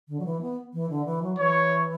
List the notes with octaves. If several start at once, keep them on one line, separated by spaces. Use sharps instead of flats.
D3
F#3
E3
B3
E3
D3
E3
F#3
E3 C#5